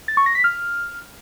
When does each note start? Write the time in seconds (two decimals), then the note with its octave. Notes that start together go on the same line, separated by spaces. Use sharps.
0.08 A6
0.17 C#6
0.26 A#6
0.35 B6
0.44 F6